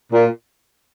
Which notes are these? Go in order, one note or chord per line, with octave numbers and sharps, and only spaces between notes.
A#2